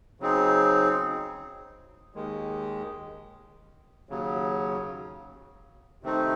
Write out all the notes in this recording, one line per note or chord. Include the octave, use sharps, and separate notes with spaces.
C#3 F#3 C4 D#4 G#4
D#2 D#3 G#3
D#2 C#3 F#3
C3 D#3 A3 C4 D#4